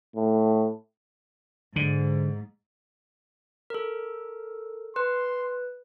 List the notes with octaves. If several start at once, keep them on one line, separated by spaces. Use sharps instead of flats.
A2
G#2 D3
A4 A#4
B4 C6